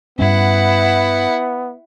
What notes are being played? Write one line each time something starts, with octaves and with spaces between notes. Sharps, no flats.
G2 G3 B3 C#4 E4 F#5